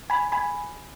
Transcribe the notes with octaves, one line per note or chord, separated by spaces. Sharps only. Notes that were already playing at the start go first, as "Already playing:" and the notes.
G#5 B5
G#5 B5